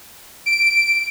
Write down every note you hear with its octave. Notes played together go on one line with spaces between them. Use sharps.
D7